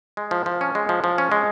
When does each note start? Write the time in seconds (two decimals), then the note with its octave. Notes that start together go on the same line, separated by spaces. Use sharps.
0.17 G#3
0.31 F3
0.46 F3
0.61 C#4
0.75 G#3
0.89 F3
1.04 F3
1.18 C#4
1.32 G#3